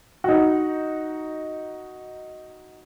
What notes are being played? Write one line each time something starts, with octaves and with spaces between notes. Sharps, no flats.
D#4 F#4